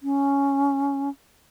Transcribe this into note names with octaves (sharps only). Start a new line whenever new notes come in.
C#4